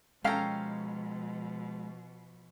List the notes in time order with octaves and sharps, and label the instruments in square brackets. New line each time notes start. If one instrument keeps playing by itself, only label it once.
[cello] B2 F3 [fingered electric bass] G#3 [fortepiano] C#4 A4 F5 [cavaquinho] G5 A#5